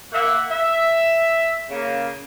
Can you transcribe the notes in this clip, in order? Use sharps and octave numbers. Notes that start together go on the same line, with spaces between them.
A#3 E5 F#5
E5
C#3 A#3